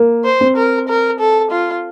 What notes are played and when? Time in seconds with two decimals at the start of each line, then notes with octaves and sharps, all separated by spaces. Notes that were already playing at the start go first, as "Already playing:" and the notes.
Already playing: A#3
0.25 C5
0.41 C4
0.56 A#4
0.88 A#4
1.19 A4
1.51 F4